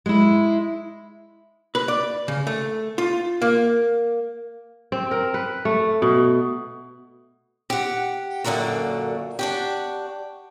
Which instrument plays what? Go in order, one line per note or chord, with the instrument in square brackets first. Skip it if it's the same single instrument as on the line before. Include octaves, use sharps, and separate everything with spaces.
[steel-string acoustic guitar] G#3 E4
[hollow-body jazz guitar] B4
D5
C#3
A3
F4
A#3
[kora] C4
A#4
B4
A3
B2
[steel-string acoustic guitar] G4 F#5
F#2 A#2 D3 A#3 F#4
D4 F#4 G4